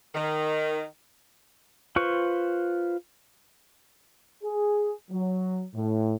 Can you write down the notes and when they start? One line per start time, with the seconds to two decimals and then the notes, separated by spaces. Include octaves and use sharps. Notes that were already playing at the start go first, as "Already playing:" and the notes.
0.14 D#3
1.96 F4 B4 C5 C#6
4.43 G#4
5.11 F#3
5.75 A2